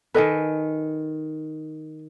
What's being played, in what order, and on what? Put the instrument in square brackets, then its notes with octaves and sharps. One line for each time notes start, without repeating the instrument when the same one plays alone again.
[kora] D#3 B4 [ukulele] A4 D#5 G#5